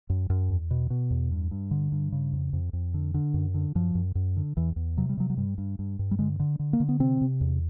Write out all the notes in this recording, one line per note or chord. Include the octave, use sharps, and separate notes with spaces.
F#2
F#2
E2
B2
B2
E2
G2
G2
D3
G2
C#3
F2
F2
F2
D3
D3
F#2
D3
F#2 F3
F#2
F#2
D3
E2 E3
E2
C3 F#3
G3
C3 F#3
F#3
G2 G3
G2
G2
G2
G3
D3 G#3
D3
D3
A#3
D3
B3
C3 C4
C3
E2